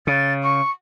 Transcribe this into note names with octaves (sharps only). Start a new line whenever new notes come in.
C#3 A6
C#6